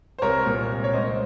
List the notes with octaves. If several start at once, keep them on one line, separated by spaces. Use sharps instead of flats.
C5
C2 A#4 C#5
A#2
C2
C#5
C#2 C5 D#5